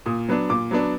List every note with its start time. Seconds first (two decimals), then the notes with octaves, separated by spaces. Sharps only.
0.06 A#2 D#6
0.29 F#3 B3 D4
0.49 A#2 D6
0.71 F#3 B3 D4